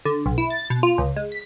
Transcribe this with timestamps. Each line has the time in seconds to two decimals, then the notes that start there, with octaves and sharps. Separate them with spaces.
0.05 D3
0.26 B1
0.38 E4
0.50 A6
0.70 B2
0.83 F4
0.98 C#2
1.16 G#3
1.32 B6